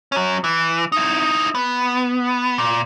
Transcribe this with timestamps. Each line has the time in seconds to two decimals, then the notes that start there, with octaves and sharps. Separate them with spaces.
0.12 F#3 C#4
0.44 E3
0.92 D#4 E4
1.55 B3
2.58 A#2